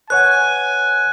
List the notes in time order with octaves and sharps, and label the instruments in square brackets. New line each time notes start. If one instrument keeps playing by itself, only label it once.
[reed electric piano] B4 C#5 F#5 [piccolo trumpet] G#5 [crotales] F#6